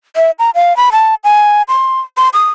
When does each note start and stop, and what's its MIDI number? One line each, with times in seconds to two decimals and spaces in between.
0.16 0.31 76
0.39 0.50 82
0.55 0.76 77
0.77 0.89 83
0.92 1.15 81
1.24 1.62 80
1.68 2.00 84
2.17 2.29 84
2.34 2.50 87